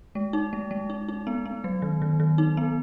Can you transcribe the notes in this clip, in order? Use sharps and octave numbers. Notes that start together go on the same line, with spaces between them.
G#3
D#4
G#3
G#3
D#4
D#4
B3
B3
F#3
D#3
D#3
D#3
D#4
B3